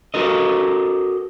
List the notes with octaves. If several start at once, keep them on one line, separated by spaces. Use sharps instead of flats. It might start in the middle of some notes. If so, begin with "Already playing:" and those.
F#4 A4 A#4 D#5